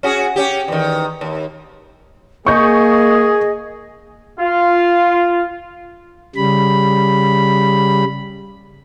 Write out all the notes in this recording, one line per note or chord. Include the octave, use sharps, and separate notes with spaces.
C#4 F#4 G#4
C#4 G4
E2 D#3
D#2
A#3 G#4 D#5 C#6 G6
F4
C#3 G3 B5